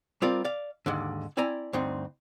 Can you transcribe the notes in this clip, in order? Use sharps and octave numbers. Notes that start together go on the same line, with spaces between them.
G3 C4 F4 A#4 D5
D5 F5
D#2 G#2 D3
C4 E4 D5 G#5 A#5
D2 G2 C4 D#4